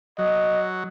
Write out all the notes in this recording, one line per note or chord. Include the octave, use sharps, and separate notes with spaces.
F#3 D#5